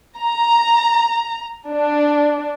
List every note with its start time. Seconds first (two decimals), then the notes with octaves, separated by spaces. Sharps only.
0.18 A#5
1.69 D4